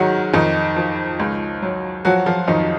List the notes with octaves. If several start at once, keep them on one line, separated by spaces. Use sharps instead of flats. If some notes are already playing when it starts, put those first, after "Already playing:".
Already playing: G#2 D#3 F#3 D#4 F#4
F2 D#3 D#4
F3
C#2
F#3
F3 F#3 F#4
F3 F4
F2 D#3 D#4